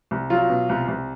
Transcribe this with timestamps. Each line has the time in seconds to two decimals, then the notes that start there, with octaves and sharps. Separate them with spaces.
0.11 C2
0.30 F#3 F4
0.50 B2
0.69 C2
0.88 C2